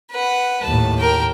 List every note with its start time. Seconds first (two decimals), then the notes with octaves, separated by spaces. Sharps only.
0.11 B4 F#5
0.64 D#2 A2 A5
1.00 A#4 G5